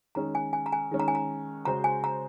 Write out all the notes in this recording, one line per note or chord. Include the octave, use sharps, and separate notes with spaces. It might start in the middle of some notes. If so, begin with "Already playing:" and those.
D#3 G#3 C#4 A#5
G#5
G#5
A#5
G#5
D#3 G#3 C#4
A#5
G#5
A#5
C#3 G#3 C#4 F#4 C5 A#5
G#5
A#5